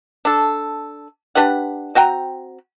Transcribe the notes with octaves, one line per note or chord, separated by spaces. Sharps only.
D4 A4
D4 G4 B4 F#5
C4 F#4 G5 A#5